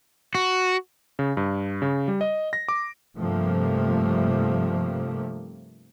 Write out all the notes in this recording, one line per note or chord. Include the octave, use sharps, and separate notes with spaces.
F#4
C#3
G2
C#3
G3
D#5
A#6
D6
G2 C3 F3 A3 A#3